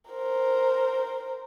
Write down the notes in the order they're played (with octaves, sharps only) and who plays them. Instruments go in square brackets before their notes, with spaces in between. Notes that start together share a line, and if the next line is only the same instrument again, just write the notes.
[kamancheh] A#4 C5